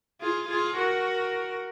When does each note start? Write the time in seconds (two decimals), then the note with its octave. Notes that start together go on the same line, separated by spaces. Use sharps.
0.21 F4 G#4
0.49 F4 G#4
0.77 F#4 A#4